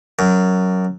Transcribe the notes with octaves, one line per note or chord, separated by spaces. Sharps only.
F#2